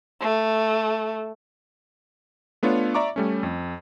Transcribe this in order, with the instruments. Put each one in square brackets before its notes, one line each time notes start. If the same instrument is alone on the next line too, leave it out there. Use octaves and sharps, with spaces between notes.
[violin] A3
[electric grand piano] A3 B3 D4 F4 C#5
D5 E5 A#5 C#6 D6
G3 A3 C#4
F2